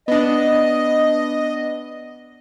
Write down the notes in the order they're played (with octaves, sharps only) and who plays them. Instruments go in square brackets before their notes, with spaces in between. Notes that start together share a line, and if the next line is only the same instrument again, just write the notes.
[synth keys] B3 D4 [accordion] D#5